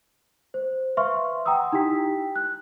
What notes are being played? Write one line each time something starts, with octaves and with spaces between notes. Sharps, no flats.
C5
B4 E5 F5 C6 C#6 F6
F#5 G5 A#5 C6 D#6 E6
D#4 E4 G4 G5 B6
F#6